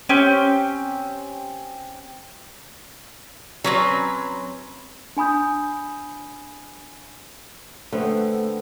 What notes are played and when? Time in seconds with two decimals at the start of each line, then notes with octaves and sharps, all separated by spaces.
0.09 C4 C#4 G4
3.64 F#3 C4 C#4 B4
5.17 D4 G#5 B5 D#6 G6
7.92 D3 A3 B3 C4